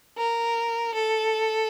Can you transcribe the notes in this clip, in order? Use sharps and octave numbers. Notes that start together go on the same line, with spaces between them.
A#4
A4